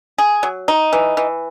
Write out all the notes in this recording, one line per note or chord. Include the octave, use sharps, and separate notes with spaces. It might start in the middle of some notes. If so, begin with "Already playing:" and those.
G#4
F#3
D#4
E3
E3